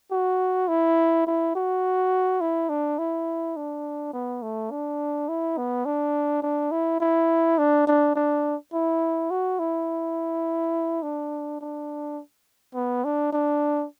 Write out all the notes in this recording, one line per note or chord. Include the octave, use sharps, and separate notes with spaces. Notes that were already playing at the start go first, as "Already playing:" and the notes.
F#4
E4
E4
F#4
E4
D4
E4
D4
B3
A3
D4
E4
B3
D4
D4
E4
E4
D4
D4
D4
E4
F#4
E4
D4
D4
B3
D4
D4